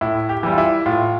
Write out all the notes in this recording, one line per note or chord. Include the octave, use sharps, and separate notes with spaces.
A2 E4
G4
E3 G3
F4
E4
A2 F4